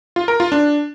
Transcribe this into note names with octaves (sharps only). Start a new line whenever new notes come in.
F4
A#4
F4
D4